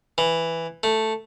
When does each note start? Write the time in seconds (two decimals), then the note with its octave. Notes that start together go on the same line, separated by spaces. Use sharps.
0.18 E3
0.83 A3